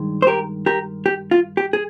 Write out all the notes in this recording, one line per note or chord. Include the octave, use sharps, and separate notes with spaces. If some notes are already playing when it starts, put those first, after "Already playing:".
Already playing: G2 D#3 G#3
C5
G4 A#4
G4 A#4
G4
F4
G4
G#4